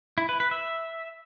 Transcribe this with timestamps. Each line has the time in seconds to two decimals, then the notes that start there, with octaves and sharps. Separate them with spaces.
0.18 E4
0.29 B4
0.40 B4
0.51 E5